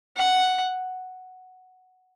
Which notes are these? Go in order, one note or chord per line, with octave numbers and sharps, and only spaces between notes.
F#5